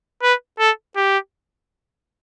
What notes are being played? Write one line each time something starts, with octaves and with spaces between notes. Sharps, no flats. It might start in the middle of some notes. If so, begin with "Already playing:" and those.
B4
A4
G4